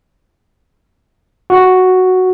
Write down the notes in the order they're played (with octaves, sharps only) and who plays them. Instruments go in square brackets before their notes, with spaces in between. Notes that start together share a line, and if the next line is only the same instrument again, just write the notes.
[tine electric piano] F#4